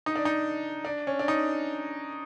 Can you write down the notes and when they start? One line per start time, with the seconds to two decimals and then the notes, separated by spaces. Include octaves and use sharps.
0.06 D#4
0.16 D4
0.25 D#4
0.85 D4
1.07 C#4
1.19 D4
1.28 D#4